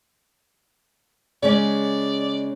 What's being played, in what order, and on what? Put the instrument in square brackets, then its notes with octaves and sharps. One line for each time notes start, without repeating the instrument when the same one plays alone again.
[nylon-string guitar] C#3 G#3 C#4 [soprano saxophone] D5